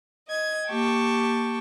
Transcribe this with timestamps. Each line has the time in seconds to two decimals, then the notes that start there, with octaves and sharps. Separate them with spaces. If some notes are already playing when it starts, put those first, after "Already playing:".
0.26 D#5 G#6
0.69 A#3 G4 G5 A5 C#6